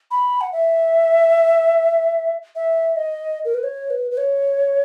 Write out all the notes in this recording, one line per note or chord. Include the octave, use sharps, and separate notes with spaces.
B5
F#5
E5
E5
D#5
A#4
B4
C#5
B4
B4
C#5